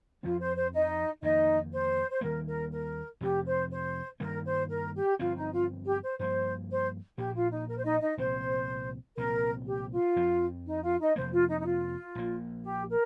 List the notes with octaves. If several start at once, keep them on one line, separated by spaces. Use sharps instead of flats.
F2 F3 C4 F4
C5
C5
D#4 D#5
F2 D#3 A#3 D#4 D#5
C5
C5
D#2 D#3 G3 A#3 A#4
A#4
A#4
F2 C3 F3 G4
C5
C5
G2 D#3 G3 A#3 A#4
C5
A#4
G4
G1 G2 F3 C4 F4
D#4
F4
G4
C5
G2 F3 A#3 C5
C5
A#1 A#2 A#3 G4
F4
D#4
A#4
C5
D#4 D#5
D#4 D#5
C2 A#2 F3 C4 C5
C2 A#2 F3 C4 A#4
G4
F4
F2 F3 C4
D#4
F4
D#4 D#5
F2 C3 F3 A#3 C5
F4
D#4
D#4
F4
A#1 A#2 A#3
G4
A#4